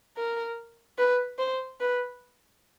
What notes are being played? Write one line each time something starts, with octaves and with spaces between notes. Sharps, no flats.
A#4
B4
C5
B4